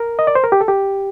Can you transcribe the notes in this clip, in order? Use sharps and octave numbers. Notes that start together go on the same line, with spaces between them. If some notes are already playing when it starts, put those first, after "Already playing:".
Already playing: A#4
D#5
D5
C5
A#4
G4
A4
G4